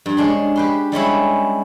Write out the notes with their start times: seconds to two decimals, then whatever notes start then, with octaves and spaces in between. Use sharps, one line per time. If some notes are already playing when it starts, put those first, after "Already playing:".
0.06 G2
0.17 G#3 C#4 D4 G#4 C6
0.56 G4 B4 C6
0.92 G3 G#3 C#4 E4